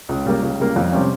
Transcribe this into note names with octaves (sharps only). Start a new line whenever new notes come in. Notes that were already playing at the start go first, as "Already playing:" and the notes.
C#2
C#3 G3 A#3
C#2
C#3 G3 A#3
F2
C3 G3 C#4